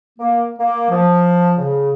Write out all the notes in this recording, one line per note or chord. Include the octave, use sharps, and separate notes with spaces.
A#3
A#3
F3
C#3